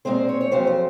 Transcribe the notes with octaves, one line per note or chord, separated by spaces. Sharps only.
A#2 G#3 C4 C5
C#5
C#5
F2 C#3 F#3 C4 C5
C5